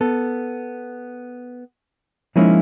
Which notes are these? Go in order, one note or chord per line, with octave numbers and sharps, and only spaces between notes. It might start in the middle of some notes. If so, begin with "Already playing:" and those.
B3 A4
F3 G#3 A#3 C#4 D#4 E4